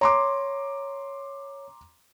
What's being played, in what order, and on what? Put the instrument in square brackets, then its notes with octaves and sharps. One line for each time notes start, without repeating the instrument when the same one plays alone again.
[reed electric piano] C#5 [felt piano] A#5 C6 D6